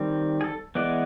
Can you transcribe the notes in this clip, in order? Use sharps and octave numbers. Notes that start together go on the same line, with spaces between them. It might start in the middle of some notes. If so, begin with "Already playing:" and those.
Already playing: D#3 G3 C4
G#4
A4
E3 G#3 B3 D5